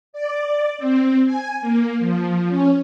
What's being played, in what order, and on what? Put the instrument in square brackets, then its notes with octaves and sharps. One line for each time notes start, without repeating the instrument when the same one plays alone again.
[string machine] D5
C4
G#5
A#3
F3
C#4